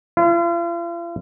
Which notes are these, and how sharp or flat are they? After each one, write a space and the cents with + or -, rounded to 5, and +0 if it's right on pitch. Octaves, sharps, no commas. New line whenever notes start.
F4 -45